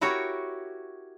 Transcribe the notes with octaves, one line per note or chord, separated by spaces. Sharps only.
E4 F#4 G4 A#4 C#5